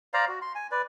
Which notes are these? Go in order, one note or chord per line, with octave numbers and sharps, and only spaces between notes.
C5 D5 F5 A#5
F#4
C6
G#5
B4 D5